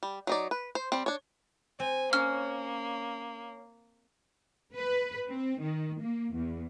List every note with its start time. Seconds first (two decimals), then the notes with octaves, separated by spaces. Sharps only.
0.03 G3
0.27 F#3 D#4 D5
0.51 B4
0.75 C5
0.92 G3 C4
1.06 D4 C#5
1.80 C4 G#5
2.13 A#3 C#4 F6
4.75 B4
5.28 C4
5.61 D#3
6.01 A#3
6.34 E2